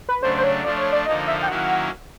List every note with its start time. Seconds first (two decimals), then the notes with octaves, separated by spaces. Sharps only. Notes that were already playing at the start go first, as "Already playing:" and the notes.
0.09 B4
0.21 C#3 F#3 A3 D4 C5
0.38 C5
0.44 C#5
0.64 F3 A3 D4 F4 D5
0.78 C#5
0.93 D5
1.06 D3 F3 A#3 D#4 D#5
1.28 E5
1.43 G5
1.48 D#3 F#3 A#3 C#4 E4 F#5